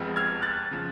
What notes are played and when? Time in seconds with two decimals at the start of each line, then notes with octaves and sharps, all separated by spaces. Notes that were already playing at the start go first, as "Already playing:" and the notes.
Already playing: F1 F2 F3 G#3 B3
0.16 F6 G#6
0.42 F#6 A6
0.71 C#3 F3